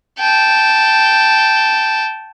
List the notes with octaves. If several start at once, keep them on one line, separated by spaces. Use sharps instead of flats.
G5 A5